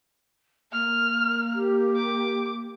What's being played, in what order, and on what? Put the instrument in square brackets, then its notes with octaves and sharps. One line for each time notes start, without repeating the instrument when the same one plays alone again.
[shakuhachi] A#3 [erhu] F6
[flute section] G4
[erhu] D6